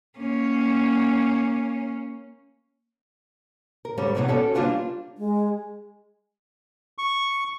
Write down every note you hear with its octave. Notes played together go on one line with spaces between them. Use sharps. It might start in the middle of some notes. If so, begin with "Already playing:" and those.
A#3 C#4
A#4
G#2 G3 A3 C#4
D#2 A2 C3 E3 B3 D#4
C#4 F#4 A4 C#5 D5
G3 A#3 D4 F4 F#4 B4
G#3
C#6